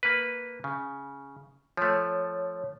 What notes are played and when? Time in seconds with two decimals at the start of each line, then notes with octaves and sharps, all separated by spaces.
0.03 A#3 B4
0.64 C#3
1.77 F3 A3 C#5